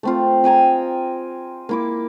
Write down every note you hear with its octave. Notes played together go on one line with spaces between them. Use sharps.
A3 C4 F4
D#5 G5 G#5 A#5
A#3 E4 D6